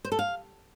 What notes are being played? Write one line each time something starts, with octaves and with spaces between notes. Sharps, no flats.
C5
A4
F5